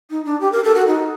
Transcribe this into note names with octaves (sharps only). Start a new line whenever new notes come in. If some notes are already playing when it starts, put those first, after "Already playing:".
D#4
D4
G4
A#4
A4
F#4
D#4